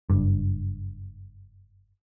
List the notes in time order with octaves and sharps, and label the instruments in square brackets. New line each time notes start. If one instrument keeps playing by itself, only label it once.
[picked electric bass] F#1 G2